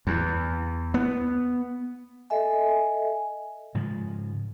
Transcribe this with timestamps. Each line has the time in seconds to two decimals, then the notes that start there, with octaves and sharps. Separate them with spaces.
0.07 E2
0.94 B3
2.30 A4 D#5 E5 G#5
3.75 G#2 C#3 F3